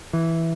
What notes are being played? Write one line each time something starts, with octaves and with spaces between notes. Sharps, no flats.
E3